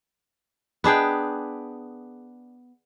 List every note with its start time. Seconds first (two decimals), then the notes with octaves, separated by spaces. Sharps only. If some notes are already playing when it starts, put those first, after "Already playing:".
0.84 B3 D4 G#4 G5